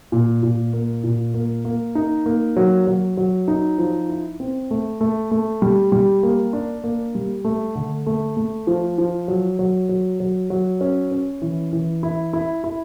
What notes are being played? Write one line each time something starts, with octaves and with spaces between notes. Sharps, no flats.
A#2
A#2
A#3
A#2
A#3
A#3
D#4
A#3
F#3
F#3
F#3
D#4
F3
E4
C4
A3
A3
A3
G3
G3
A#3
D4
A#3
G3
A3
D3
A3
A3
F3
F3
F#3
F#3
F#3
F#3
F#3
C#4
C#4
E3
E3
E4
E4
E4